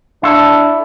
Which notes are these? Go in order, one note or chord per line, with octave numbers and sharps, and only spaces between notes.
D4 E4 A4